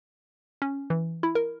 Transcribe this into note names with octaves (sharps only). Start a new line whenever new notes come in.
C#4
E3
E4
A#4